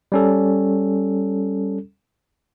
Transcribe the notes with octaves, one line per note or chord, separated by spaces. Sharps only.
G3 C#4 A4